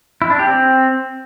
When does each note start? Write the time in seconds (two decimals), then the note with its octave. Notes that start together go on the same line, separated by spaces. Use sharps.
0.22 E4
0.30 D4
0.39 G4
0.48 C4